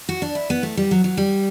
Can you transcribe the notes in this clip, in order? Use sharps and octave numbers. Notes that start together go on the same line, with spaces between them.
F#4
D4
E4
B3
A3
G3
F#3
F#3
G3